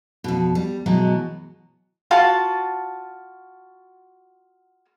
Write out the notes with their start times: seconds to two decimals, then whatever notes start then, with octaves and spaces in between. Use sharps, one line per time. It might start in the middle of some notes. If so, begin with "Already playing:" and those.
0.24 F2 B2
0.55 G3
0.86 B2 E3 F#3 G#3
2.11 F4 F#4 A5